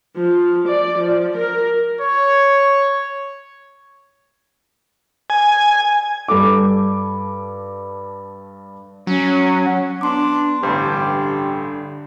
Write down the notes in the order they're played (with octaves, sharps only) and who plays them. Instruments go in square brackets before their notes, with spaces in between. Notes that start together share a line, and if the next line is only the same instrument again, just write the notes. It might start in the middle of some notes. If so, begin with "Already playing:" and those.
[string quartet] F3
D5
F3
A#4
[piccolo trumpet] C#5
[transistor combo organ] G#5
[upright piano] G2 A4 D6
[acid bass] F#3 [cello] C#4
[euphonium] B3 [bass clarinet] D4 [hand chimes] C6 D6
[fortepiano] A1 G2 [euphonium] D3 [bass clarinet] G4